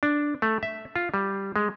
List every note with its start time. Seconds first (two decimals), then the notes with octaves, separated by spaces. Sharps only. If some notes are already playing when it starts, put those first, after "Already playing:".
0.03 D4
0.42 A3
0.63 E5
0.96 F4
1.14 G3
1.56 G#3